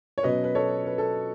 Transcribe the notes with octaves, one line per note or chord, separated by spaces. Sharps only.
C#5
B2 F#3 C#4 B4 D#5
B4
A4 C#5
B4
A4